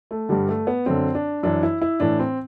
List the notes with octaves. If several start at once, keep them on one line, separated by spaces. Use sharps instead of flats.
A3
G2 D3 G3
A3
B3
F#2 D3 C4
D4
F#2 E3 D4
E4
E4
A2 E3 D4
C4